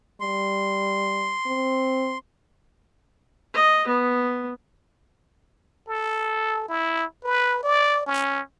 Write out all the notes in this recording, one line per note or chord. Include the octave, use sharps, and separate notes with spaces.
G3 C6
C4
D#5
B3
A4
E4
B4
D5
C#4